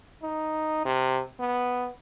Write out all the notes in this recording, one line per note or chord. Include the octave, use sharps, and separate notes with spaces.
D#4
C3
B3